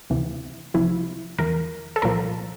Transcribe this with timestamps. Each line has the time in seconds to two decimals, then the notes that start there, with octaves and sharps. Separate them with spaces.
0.10 D2 C3 E3
0.74 C2 C3 F3 E4
1.38 E2 E3 A#4
1.96 A4
2.02 C2 A#2 F3 A#4